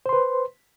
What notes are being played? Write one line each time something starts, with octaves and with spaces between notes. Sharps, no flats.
B4 C5 C6